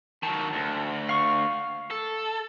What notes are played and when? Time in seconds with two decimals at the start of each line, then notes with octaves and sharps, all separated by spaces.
0.23 D#3 F#3 A5
0.53 D2
1.09 F5 C#6
1.90 A4